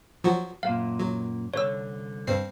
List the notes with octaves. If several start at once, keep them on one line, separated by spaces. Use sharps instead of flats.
F3 F#3 F#4
F#2 A#2 F5
F#3
C2 D3 C#5 E6
G2 C4 C7